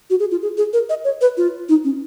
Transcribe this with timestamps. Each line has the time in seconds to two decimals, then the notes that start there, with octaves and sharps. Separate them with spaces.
0.10 F#4
0.20 G#4
0.31 F4
0.42 G#4
0.58 G#4
0.73 A#4
0.90 D#5
1.04 C#5
1.21 B4
1.37 F4
1.69 D#4
1.84 C#4